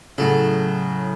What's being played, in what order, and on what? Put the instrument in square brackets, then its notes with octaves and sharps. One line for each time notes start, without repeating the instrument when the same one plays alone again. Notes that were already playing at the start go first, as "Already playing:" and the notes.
[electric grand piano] A2 C#3 [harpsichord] F#3 A4